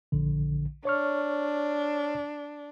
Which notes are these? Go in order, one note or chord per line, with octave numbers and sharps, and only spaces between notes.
A#1 D3
D4 C#5 C#6 F6